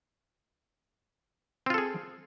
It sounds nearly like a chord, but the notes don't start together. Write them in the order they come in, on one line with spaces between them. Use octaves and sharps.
C4 F4 A4 G#4